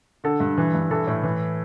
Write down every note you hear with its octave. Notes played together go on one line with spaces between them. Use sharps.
D3 A4
G2
E3
G2
E3 A4
A2
E3